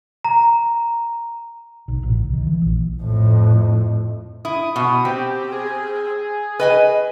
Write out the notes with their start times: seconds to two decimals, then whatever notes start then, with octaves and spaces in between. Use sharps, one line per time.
0.25 A#5
1.88 B1
2.03 A1
2.19 C2
2.33 D#3
2.47 E3
2.61 A#1
3.02 F2 A2
4.45 E4 D#6
4.76 B2
5.05 C4 G4
5.52 G#4
6.60 B4 D#5 G#5